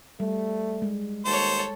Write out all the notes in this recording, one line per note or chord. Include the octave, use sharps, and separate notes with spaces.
G3 A3
G#3
D#2 A4 C5 C#5